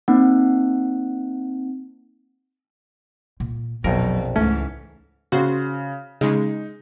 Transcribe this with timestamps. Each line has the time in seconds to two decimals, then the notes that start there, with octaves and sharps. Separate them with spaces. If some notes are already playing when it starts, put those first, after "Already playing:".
0.08 A#3 C4 D#4 F#5
3.40 A#2
3.84 A#1 F2 B2 F#3 A#4
4.36 C#2 G#2 E3 A3 C#4
5.32 C#3 F#4 C5
6.21 C#3 G#3 D#4